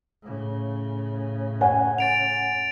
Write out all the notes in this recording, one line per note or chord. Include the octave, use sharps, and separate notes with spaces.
A2 C#3
C#5 F#5 G#5
A6 D7 F7